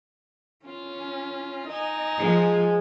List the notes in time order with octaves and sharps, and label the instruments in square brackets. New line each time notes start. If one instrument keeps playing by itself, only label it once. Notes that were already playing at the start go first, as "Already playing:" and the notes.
[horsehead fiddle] C#4 [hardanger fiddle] F4
[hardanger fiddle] D#4 G#5 [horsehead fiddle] D#5
[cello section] F3 [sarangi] G#3